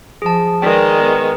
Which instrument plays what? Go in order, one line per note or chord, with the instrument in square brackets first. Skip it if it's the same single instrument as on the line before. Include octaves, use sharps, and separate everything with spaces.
[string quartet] F3 [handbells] G#4 A5
[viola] D#3 G#3 [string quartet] B4 D5 [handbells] G5
[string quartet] B3